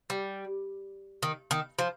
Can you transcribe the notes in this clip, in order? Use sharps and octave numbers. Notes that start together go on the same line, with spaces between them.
G3
D#3
D#3
F3